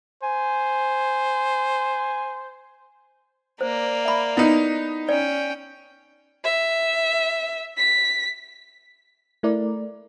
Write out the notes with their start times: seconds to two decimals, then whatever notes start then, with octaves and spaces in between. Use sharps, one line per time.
0.23 C5 G#5
3.61 A#3 C5 D5
4.05 E5 B5
4.37 B3 D#4 E4
5.09 C#4 D5 G5
6.44 E5
7.78 B6
9.43 A3 E4 A#4 D5